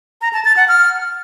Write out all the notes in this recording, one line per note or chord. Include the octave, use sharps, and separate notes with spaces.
A#5
A5
A6
F#5
F6